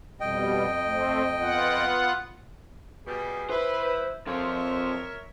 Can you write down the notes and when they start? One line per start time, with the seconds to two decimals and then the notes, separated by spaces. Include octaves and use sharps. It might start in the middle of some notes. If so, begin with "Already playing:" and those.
0.20 F2 B2 G3 D#5 G5
0.84 A3 C4
1.40 B3 F4 F#5
3.07 B2 G3 G#4
3.50 E4 B4 C5
4.27 F3 C4 A#4 C5 C#5 E5